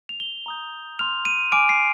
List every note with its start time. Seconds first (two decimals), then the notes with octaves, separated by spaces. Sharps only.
0.09 F7
0.20 G7
0.46 A#5 D#6 G6
0.99 C6 F6 F7
1.25 D#7
1.52 G#5 D6 F6 D7
1.69 C7